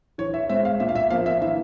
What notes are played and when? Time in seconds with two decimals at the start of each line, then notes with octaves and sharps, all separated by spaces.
0.18 E3 C#5
0.34 E5
0.49 G#3 C4 E5
0.65 F5
0.80 A#2 E5
0.89 F5
0.95 E5
1.10 F3 A#3 F5
1.26 E5
1.41 E3 E5